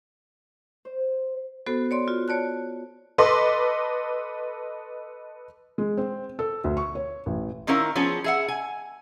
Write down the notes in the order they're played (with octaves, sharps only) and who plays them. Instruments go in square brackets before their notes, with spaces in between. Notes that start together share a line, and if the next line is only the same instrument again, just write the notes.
[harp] C5
[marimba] B3 F#4 A4 C5
C#5 D5 C6
F4 F#4
C#5 D5 A5 F#6
[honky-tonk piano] A4 B4 D#5 C6 D6
[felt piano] G#3
C4
A4
D2
C#6
C#5
A1
[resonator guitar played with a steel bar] D#3 C4 C#4 E4 A#4 F5
F3 B3 C#4 G#4
G#4 E5 F#5
G#5